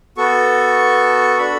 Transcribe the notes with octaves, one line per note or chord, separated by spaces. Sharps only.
B3 F#4 A4 C#6
D4 F#4 A4 B5